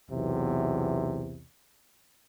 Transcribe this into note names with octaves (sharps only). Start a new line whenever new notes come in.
B1 E2 C3